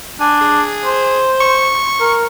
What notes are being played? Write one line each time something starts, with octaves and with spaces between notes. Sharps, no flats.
D4 G#5
G#4
C5
C#6
A#4